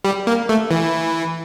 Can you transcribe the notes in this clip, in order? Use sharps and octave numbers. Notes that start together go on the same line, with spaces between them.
G3
A#3
A3
E3